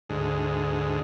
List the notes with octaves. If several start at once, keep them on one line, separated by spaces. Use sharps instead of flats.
D2 G#2